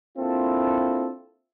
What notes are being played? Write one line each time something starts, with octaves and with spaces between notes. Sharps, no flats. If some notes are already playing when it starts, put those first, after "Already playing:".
A#3 C4 D4 E4 F4 A4